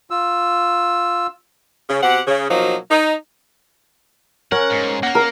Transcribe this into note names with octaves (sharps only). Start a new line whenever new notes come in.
F4 E6
C#3
B2 C4 G4 F#5
C#3
B2 F3 F#3 A#3 D#4
D#4
C#4 A#4 F#5
G#2
A#3 F#5 A#6
A#4